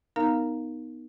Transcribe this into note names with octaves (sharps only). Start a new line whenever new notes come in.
B3 D#4 A#4 F5 A#5 F6